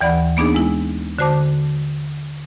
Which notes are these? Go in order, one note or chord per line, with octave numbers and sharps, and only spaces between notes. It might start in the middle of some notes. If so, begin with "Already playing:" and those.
D#2 E3 D5 F#5 B5
A#3 B3 D4 D#4 G#4
G#3 E4
D3 F#4 C5 A5 D6